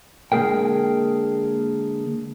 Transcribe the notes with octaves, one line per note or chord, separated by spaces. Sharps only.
D3 G#3 A#3 G#4 A#4 G5